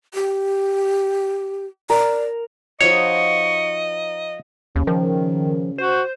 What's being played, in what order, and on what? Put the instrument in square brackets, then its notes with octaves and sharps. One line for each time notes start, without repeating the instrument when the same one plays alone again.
[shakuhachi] G4
[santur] A#4 [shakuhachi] D5
[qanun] F3 D#4 F#4 [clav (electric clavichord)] C#5 [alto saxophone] D#5 [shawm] C#6
[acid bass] D#2 [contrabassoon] C#3
[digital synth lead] D#3 [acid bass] F3
[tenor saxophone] F#4 [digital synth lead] C5